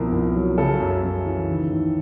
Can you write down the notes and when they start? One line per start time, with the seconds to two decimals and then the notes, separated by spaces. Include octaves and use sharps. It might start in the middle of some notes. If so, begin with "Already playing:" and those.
Already playing: C2 B2 F3 A#4
0.12 C2
0.35 F#3
0.58 C#3 A4
0.80 F#2
1.03 F#2
1.26 E3
1.48 D#3
1.71 D#2